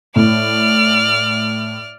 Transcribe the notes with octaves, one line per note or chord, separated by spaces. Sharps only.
A2 D5 F6